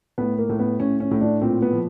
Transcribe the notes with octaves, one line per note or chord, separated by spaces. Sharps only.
A2 B3
A#3
A2
B3
A2 C#4
C#4
A2
D4
A#2 C4
B3
F3